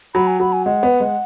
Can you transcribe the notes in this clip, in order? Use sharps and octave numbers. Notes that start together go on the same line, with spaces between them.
F#3 B5
G#5
F#3 B5
G#5
G#3 F#5
B3
G#3